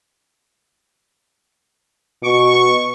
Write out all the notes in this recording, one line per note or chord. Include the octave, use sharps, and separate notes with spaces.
B2 C#6